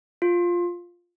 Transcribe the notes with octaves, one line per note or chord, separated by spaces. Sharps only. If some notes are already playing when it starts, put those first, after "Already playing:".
F4